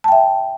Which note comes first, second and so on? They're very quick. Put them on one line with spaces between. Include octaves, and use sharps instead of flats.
A5 G5 E5